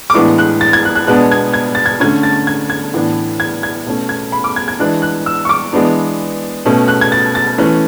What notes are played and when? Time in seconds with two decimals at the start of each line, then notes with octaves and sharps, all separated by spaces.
0.10 D6
0.14 A2 E3 G#3 B3 D4 C#6
0.38 F#6
0.61 A6
0.73 G#6
0.85 F#6
0.95 F#6
1.07 B2 G#3 B3 D4 F#6
1.32 G#6
1.54 G#6
1.75 A6
1.86 G#6
2.00 D3 A3 C#4 G#6
2.23 A6
2.47 G#6
2.70 G#6
2.94 A2 E3 B3 D4
3.40 G#6
3.63 G#6
3.86 B2 A3 C#4
4.09 G#6
4.32 B5
4.44 D6
4.56 G#6
4.68 G#6
4.79 E3 G#3 D4 F#6
5.02 F#6
5.26 E6
5.45 C#6
5.49 D6
5.73 E3 G#3 B3 D4
6.65 B2 A3 C#4
6.88 F#6
7.01 G#6
7.12 A6
7.35 A6
7.58 E3 A3 C#4